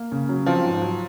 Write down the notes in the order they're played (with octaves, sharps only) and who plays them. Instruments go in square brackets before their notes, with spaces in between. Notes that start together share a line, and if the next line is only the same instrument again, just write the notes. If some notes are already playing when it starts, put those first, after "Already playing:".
Already playing: [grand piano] A#3
C#3
F#3
[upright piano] F3 [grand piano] C4
[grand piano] G#2
F#3